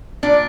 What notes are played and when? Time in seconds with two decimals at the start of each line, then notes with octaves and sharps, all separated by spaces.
0.23 A#2 D4